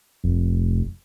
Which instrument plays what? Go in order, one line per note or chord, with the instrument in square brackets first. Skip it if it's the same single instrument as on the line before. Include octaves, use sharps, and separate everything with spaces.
[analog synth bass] F1